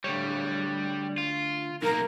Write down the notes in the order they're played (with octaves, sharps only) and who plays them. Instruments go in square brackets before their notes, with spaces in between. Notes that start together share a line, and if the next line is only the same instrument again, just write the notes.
[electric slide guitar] D3 A3 C#5 [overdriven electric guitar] G3
[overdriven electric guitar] F4
[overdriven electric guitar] B1 A#3 [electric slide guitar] D#4 [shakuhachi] A#4